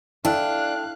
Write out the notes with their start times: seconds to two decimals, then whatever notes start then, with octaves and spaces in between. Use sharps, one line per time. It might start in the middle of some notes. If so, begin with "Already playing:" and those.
0.25 D4 E4 A4 F5 G5 A5 F#6